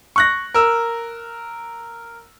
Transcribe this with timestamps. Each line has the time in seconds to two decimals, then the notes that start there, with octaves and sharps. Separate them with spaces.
0.16 C#6 F#6 A#6
0.54 A#4 E6